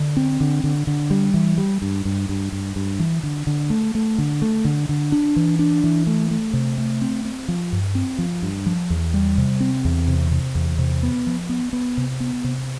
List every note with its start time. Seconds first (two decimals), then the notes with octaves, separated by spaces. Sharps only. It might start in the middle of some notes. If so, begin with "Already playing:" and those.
Already playing: D3
0.17 C4
0.40 D3
0.64 D3
0.87 D3
1.10 G3
1.34 E3
1.58 G3
1.82 G2
2.05 G2
2.29 G2
2.52 G2
2.76 G2
2.99 E3
3.23 D3
3.47 D3
3.70 A3
3.95 A3
4.18 D3
4.42 A3
4.65 D3
4.89 D3
5.12 D4
5.36 E3
5.59 D4
5.84 E3
6.07 A3
6.31 A3
6.53 C3
6.78 A3
7.02 C4
7.25 C4
7.48 F3
7.73 G2
7.95 C4
8.19 F3
8.42 G2
8.66 F3
8.90 E2
9.14 G3
9.38 C3
9.60 C4
9.85 E2
10.08 C3
10.31 C3
10.55 E2
10.79 C3
11.03 B3
11.27 F3
11.49 B3
11.73 B3
11.97 C3
12.20 B3
12.44 C3